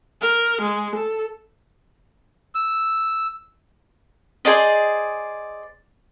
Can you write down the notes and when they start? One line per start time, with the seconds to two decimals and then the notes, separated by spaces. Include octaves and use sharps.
0.21 A#4
0.62 G#3
0.95 A4
2.55 E6
4.45 G#4 C5 D5 D#5